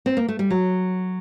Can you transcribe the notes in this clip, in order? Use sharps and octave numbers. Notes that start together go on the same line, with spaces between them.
C4
A#3
A3
G3
F#3